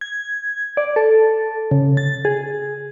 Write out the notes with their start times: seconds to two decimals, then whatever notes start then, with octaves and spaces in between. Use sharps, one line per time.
0.01 G#6
0.77 D5
0.96 A4
1.71 C#3
1.97 A6
2.25 G#4